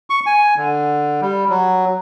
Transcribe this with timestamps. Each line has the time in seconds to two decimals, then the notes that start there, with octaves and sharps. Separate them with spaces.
0.10 C#6
0.26 G#5
0.57 D3
1.22 G3
1.50 F#3